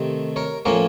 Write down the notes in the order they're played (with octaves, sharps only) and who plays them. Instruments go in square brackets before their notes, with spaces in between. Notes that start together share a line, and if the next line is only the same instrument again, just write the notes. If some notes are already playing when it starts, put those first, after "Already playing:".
Already playing: [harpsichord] C3 D#3 A3 C4
A#4 C#5
A2 F3 A#3 C#4 A#4 C#5